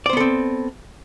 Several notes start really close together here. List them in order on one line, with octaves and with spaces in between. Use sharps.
D5 C5 B3 A4 C4